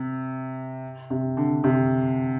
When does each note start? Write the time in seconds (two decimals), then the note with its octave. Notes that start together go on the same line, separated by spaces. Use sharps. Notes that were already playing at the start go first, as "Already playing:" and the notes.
Already playing: C3
1.10 C3
1.37 D3
1.64 C3